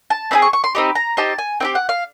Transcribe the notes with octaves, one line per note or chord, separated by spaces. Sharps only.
A5
C4 D#4 G#4 B5
C#6
C#6
C6
C4 D#4 G4 B5
A#5
C4 D#4 G4 A5
G#5
C4 D#4 G4 G5
F#5
F5